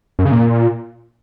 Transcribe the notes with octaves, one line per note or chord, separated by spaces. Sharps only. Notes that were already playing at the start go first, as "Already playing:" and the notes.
F#2
C#3
A#2